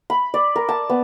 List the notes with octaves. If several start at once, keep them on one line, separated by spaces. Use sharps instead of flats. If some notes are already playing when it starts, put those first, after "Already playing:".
B5
D5
A#4
A5
B3